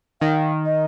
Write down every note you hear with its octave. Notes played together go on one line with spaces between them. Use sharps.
D#3 F5
D#5